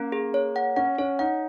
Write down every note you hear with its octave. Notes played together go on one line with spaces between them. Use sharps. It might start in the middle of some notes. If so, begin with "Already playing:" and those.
Already playing: A#3 C#4
G#4
C#5
F#5
C#4 F#5
C#4 C#5
D#4 F#5